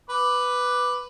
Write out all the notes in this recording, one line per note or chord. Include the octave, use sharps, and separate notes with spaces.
B4 D6